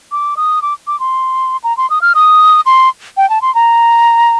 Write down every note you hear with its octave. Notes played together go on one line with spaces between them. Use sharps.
D6
D#6
D6
D6
C6
A#5
C6
D#6
F6
D#6
C6
G5
A5
C6
A#5